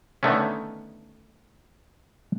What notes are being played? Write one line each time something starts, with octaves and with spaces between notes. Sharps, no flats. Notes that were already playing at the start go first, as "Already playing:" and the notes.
D3 D#3 A3 B3 C#4